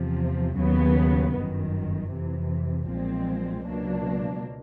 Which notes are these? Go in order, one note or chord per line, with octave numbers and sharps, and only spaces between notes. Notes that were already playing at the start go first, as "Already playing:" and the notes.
Already playing: E2 C3 F3
D#2 C#3 F#3 B3
G1 F#2 D#3
F2 C3 E3
B1 A#2 F3 G#3 C4
C#2 B2 F#3 A#3 D4